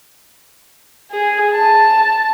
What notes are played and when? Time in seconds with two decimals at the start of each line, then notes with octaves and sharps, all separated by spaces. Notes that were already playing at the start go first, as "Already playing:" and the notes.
1.11 G#4
1.53 A5